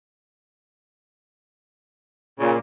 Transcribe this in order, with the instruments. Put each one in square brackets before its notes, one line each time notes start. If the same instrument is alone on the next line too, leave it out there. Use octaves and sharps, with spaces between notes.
[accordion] A#2 [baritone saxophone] C#3